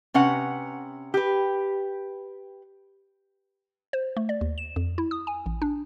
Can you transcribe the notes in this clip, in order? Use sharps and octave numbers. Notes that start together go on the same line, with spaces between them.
C3 C#4 B4 F#5
G4 B4
C5
A3
D5
D#2
E7
F2
E4
D#6
G#5
A1
D4